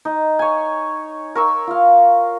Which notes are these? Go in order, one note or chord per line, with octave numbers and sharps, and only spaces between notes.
D#4
C#5 G#5
A#4 C#6 E6
F4 F5